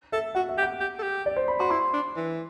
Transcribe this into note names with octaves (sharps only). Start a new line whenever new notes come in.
A4 E5
F#4 F#5
E5
G4
F#5
G4
A4
G4
D5
C5
B5
F#4 C6
E4 C6
D4
E3